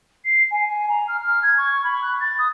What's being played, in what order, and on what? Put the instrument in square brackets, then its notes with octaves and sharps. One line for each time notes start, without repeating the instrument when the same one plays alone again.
[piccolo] C7
G#5
G#5
A#5
F6
F6
G#6
C#6
B5
F#6
A6
D#6